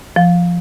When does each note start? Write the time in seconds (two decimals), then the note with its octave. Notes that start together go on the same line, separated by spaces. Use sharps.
0.16 F3